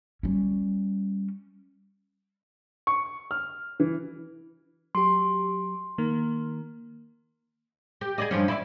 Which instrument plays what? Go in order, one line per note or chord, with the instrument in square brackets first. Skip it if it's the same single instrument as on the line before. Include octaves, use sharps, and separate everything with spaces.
[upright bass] G3 C#4
[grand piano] C#6
F6
E3
[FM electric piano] F#3 G4 [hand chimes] C6
[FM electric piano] D#3 A#3
[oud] G4
G#4 D5 D#5
G2 F3 C#4
E4 C5 D5